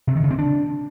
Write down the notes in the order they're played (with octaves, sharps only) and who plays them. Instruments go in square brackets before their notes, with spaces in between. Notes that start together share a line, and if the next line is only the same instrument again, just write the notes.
[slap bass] C3
D#3
C#3
C4
D4